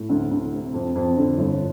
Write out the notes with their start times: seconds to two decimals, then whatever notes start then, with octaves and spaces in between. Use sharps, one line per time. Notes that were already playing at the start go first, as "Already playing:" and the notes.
Already playing: A2
0.09 D2
0.31 D2
0.52 C3
0.74 F2
0.95 F2
1.17 D3
1.38 G1